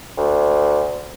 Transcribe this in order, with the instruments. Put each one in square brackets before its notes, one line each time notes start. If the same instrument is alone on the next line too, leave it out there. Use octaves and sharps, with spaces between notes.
[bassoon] D2